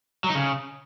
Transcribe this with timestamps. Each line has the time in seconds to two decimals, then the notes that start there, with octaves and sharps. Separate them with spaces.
0.24 F#3
0.30 D#4
0.35 C#3